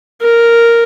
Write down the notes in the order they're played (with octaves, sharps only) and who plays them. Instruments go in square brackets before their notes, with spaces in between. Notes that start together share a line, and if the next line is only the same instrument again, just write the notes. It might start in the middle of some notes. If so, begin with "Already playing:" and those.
[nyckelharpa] A#4